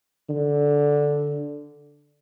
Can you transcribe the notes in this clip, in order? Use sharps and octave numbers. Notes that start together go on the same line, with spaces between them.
D3